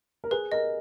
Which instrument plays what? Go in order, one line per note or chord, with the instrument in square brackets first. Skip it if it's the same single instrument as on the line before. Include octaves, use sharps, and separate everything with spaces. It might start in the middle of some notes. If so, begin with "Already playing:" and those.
[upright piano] A#4
[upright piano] G#4 [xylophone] B4
[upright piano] A#4 [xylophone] D#5